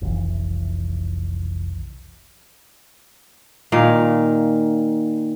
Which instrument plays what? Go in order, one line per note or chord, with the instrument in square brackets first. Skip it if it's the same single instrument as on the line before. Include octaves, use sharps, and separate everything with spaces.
[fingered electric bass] F1 B1 E3
[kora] A#2 D#3 F5